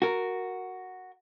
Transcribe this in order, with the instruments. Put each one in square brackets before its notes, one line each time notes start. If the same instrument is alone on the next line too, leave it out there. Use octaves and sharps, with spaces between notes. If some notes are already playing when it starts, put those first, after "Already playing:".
[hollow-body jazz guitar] F#4 A#4